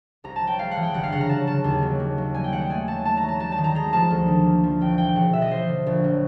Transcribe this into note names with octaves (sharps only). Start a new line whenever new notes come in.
C2 A#5
A5
F#3
G5
G#3 F5
F#5
E3
G5
G1 F#5
F5
C#3 F#5
A#5
F#3 A5
C#3 A5
D#2
F#3
A#3
F#3
G3 G#5
G5
D#3 F#5
G5
A3 G#5
F#3 A5
A3 A5
A#5
F#3
A5
G3 A5
A5
D#3
A#5
G#3 A#5
F3 A5
D2
D#3
A#3
F3
A#1 G5
E3 G5
E1 F#5
B2 E5
D#5
F3 C5
D3
A#1
F#3